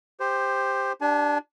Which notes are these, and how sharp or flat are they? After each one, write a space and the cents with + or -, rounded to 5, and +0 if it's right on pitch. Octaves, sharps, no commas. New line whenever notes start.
G4 +15 C5 +0
D4 +0 G4 -5 G#5 +45